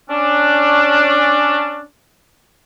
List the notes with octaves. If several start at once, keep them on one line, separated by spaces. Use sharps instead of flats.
C#4 D4